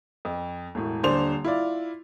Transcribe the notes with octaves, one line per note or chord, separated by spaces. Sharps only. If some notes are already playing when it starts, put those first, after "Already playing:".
F2
E1 A2
D#1 D3 C5 D5 C6 F7
E4 F4 D5